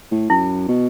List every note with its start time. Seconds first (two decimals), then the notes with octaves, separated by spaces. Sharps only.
0.11 A2
0.30 F#2 E4
0.68 B2